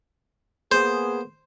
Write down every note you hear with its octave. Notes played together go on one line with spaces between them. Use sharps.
A#3 B3 G#4 C5